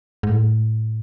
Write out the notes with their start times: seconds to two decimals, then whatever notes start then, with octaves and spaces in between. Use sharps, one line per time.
0.23 G#2
0.29 A2